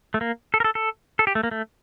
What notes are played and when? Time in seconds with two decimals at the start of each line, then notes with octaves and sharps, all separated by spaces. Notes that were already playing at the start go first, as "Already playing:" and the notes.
0.14 A3
0.21 A#3
0.54 A4
0.60 A#4
0.64 A4
0.75 A4
1.19 A4
1.27 G4
1.35 A3
1.43 A#3
1.51 A3